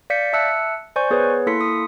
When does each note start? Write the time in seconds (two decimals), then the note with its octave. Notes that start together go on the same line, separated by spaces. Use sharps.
0.10 D5 F5 G6 B6 C#7
0.33 E5 A5 E6 F#6 C#7
0.96 C5 D5 G#5 C#6 G6
1.10 B3 G#4 B4 C#5
1.46 A#3 E4 A4 C6 B6 C#7
1.61 D#6